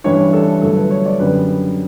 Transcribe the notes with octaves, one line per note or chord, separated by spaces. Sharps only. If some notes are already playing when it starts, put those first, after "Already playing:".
A1 G2 E3 G3 D4 C#5
A4
G1 G2 F#3 A3 A4
B4
C#5
D5
F#2 D3 G3 B3 B4